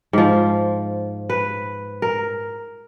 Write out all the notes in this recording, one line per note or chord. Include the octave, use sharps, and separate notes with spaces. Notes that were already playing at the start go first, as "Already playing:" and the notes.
G#2 F3
B4
A#4